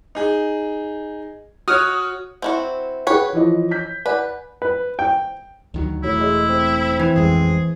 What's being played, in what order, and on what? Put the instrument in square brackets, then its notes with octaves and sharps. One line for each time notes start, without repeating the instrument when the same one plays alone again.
[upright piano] D#4 G#4
[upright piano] F#4 C#5 [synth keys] D#6 F6
[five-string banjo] C4 E4 F#4
[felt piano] G#4 F#5 G5 [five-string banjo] B4 C#5
[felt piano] E3 F3 D#5
G6 B6
[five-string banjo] B4 [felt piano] D5 F#5 G#5
[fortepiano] B4
G5
[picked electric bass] D2 D#3 F#3
[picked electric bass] E1 A3 [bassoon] F#3 [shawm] E4
[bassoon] G#3
C4
[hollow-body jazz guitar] E3 [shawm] G#5
[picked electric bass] A1 F2 G#3 [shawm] G#4